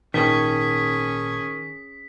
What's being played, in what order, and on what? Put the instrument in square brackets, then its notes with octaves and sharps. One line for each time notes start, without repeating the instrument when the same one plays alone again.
[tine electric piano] G#1 A#2 A5 [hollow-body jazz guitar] D#3 [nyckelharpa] C#4 G#4 [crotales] B6